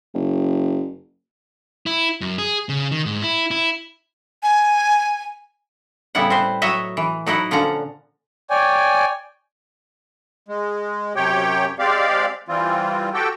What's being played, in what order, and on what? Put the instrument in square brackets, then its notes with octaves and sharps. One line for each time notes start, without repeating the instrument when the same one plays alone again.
[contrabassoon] F#1
[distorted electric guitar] E4
F#2
G#4
C#3
D#3
G#2
E4
E4
[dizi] G#5
[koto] A2 C#3 G3 B3 E4 F#5
C4 B4 C5
F#3 C#5 D#5 E5
E3
F#3 D#4 E4 D#5 F#5
A#2 D3 F3 C#4 F#5 A#5
[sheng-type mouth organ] C#5 D5 G5 G#5
[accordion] G#3
F#2 C3 G4 C#5 G5
G#3 C4 G4 D5 F5
E3 G3 C4 F4
F#4 G4 A4 G5